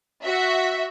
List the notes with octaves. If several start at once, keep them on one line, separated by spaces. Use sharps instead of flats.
F#4 E5